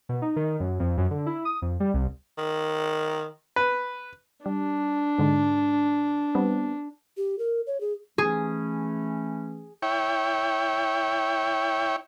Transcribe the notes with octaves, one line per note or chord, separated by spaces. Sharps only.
B2
D#4
D#3
F#2
F2
F#2
D3
E4
D#6
F2
G3
C2
D#3
B4
G3 D4
G#2 D3 G#3
G3 B3 C4
G4
A#4
C#5
G#4
E3 A3 C#4 G#4
E4 C#5 G5